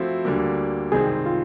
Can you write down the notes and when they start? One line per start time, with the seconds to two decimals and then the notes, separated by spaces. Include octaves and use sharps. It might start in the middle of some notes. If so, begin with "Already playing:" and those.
Already playing: F3 A3 C4 E4 F#4
0.25 D2 D3 G3 A#3
0.92 C2 C3 D#3 G#3 C4 G#4
1.26 F4